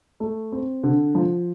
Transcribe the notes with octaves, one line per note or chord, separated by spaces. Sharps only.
A3
C4
D3
F3